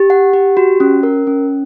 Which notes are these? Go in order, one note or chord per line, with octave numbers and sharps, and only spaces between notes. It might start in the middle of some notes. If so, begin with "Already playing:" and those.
Already playing: G4
F#5
G4
F#4
C#4
A#4
C#4